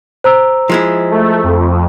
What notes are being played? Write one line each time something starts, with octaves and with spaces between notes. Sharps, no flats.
C5 A#5 E6
F3 G#3 E4
A3
F2